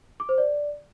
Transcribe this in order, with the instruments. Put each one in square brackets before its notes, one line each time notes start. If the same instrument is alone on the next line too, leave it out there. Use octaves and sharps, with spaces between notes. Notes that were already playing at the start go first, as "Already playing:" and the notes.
[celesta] D6
C5
D5